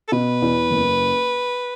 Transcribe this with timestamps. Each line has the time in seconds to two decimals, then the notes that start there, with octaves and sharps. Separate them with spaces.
0.08 A4
0.12 B2 B4
0.42 E2
0.70 F#1